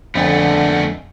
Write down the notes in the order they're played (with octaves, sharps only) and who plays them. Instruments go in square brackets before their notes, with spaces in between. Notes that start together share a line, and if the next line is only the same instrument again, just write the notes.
[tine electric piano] F2 D#5 G#5 [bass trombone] D3 [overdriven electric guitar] A3 B3